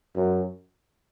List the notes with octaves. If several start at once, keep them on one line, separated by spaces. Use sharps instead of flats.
F#2